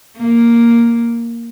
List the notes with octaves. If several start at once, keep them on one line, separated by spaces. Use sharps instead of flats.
A#3